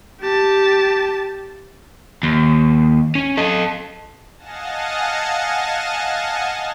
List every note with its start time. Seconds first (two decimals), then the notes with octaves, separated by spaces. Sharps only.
0.21 G4 A5
2.23 D#2
3.15 C#4
3.37 A4 D#5
4.37 D#5 F5 F#5 G#5 A5 A#6